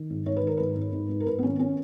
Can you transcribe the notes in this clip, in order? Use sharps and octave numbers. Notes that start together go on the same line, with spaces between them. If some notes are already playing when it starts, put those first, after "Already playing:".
Already playing: D#3
G#2
G#2 C#5
B4
D#3 A#4
G#2 B4
G#2
G#2
G#2
A#4
G#2 B4
B3
D#3 C#4
C#4